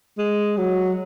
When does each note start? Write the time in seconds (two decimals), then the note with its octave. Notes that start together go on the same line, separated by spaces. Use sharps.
0.18 G#3
0.57 F#3